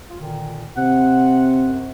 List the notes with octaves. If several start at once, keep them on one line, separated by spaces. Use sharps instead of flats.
F4
A#2 D3 D#3
C3 F#5
F#2